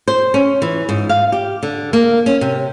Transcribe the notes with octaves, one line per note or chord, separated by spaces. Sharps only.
C5
C#4
E3
G#2
F5
G4
D3
A#3
C#4
C3